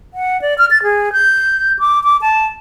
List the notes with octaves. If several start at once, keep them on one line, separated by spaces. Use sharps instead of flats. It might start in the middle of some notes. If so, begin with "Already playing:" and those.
F#5
D5
F6
A6
G#4
G6
D6
D6
A5